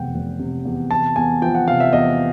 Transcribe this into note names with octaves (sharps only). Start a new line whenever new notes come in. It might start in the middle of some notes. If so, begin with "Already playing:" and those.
Already playing: F1 E2 C3 F#5 G5
F1
C3
E2
E2 A5
E2 G#5
F3 G5
F#5
C3 F5
E5
E2 D#5